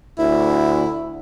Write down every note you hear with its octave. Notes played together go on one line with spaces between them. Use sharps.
D2 E4